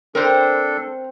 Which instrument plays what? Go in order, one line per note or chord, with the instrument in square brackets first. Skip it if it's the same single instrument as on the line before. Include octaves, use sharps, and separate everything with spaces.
[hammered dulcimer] C4 [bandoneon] D4 A4 [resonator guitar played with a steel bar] A#4 C5